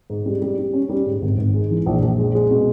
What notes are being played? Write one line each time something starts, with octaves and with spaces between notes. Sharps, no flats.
G#2
G3
G3
G3
C#4
G3
G#2
G#1
G#1
G#3
E3
A#1
A#1
G#3
G#3
B2